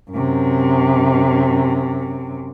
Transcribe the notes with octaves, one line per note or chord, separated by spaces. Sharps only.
F#2 C3